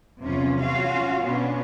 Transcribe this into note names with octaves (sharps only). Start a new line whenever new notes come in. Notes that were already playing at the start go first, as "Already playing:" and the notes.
E2 C3 F3 F#3 C#4 F4
C#4 F4 F#4 F5
B2 B3 C#4 D4